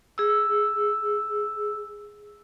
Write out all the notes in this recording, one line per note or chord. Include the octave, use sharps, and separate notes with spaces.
G#4 E6